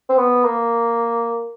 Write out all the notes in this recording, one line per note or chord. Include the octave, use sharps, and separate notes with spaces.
C4
B3
A#3